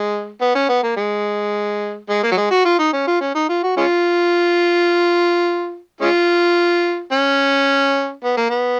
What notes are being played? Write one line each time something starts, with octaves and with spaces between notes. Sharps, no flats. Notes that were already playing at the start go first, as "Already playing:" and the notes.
Already playing: G#3
B3
C#4
B3
A#3
G#3
G#3
A#3
F#3
G#3
F#4
F4
D#4
C#4
F4
C#4
D#4
F4
F#4
G#3 C#4 F4
G#3 C#4 F4
C#4
B3
A#3
B3